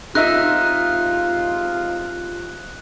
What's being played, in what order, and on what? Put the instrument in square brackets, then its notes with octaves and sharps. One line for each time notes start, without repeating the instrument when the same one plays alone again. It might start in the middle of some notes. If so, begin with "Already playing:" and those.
[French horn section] C3 G#3 F4 [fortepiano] D#4 D#5 E5 [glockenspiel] F#6